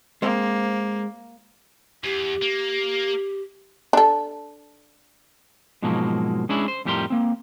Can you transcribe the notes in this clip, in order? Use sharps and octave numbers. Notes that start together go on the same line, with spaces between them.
G#3 A#3 C4 C5
E2 G4
A#3
D4 A4
G#2 B2 F3 F#3 G#3 A#3
G#3 C#4 D4 E4 G#4
C5
F2 A2 G3 G4 A#4 C6
A#3 C4